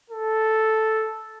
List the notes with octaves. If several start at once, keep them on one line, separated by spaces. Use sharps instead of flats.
A4